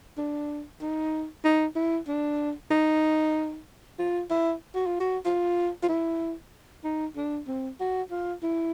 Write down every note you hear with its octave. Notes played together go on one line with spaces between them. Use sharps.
D4
D#4
D#4
E4
D4
D#4
F4
E4
F#4
F4
F#4
F4
F4
E4
D#4
D4
C4
F#4
F4
E4